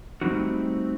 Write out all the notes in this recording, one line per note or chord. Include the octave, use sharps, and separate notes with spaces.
G3 A3 C4 D#4 F#4